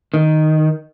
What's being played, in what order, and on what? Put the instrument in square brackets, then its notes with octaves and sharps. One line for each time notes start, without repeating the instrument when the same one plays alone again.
[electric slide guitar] D#3